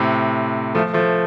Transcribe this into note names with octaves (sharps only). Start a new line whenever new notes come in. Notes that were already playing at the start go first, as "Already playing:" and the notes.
Already playing: A2 C3
F3 A3
F3 A3